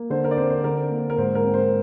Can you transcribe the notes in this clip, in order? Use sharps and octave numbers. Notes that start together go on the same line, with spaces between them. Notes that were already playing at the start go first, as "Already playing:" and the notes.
Already playing: A#3
D3 C5
A#4
D5
C4 C5
C5
D3 A#4
A#3
A#4
G#2 C5
A#4
C4
C5